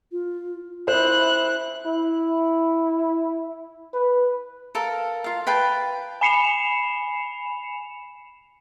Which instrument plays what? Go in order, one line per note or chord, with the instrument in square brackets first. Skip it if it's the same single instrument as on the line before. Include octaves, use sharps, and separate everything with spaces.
[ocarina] F4
[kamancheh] E4 F#6 [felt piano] C5
[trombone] E4
B4
[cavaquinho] A4 A#4 F5
F4 F5
B4 F5 G5 A5
[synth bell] G#5 B5 C7 C#7 E7 F7